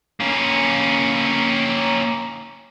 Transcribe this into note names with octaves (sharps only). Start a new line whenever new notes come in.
A#3 C#4